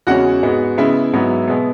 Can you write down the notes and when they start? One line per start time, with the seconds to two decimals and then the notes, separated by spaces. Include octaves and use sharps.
0.07 E2 C#3 G#3 C#4 F#4 F#5
0.43 G#2 G#3 B3
0.78 C#3 G#3 B3 E4 E5
1.13 G#2 F#3 B3
1.48 B2 G#3 B3